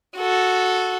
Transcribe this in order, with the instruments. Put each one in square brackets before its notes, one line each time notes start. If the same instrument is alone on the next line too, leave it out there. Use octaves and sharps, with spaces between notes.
[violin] F#4 A4